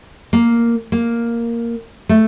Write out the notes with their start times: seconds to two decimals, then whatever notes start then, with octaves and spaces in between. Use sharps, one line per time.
0.33 A#3
0.92 A#3
2.09 A3